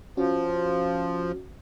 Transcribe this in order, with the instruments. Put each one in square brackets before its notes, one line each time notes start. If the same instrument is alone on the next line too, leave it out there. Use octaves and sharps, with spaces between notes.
[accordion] F3 [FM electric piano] C#4 F#4